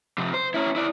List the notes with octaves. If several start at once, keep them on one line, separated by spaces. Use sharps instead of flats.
C3 F3
C5
C#4 E4
E4 D5